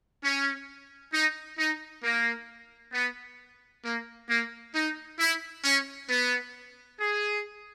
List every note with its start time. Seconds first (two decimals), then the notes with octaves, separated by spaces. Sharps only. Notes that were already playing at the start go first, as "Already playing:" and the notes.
0.23 C#4
1.13 D#4
1.58 D#4
2.03 A#3
2.94 B3
3.84 A#3
4.29 A#3
4.74 D#4
5.19 E4
5.65 C#4
6.09 B3
7.00 G#4